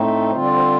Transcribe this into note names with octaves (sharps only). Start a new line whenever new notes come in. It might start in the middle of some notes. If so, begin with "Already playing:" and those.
Already playing: A2 A3 C4 D#4
D3 G3 C4 F4 C5
D5
C5